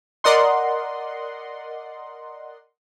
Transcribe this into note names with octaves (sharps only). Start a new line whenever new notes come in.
A#4 D5 D#5 F#5 C6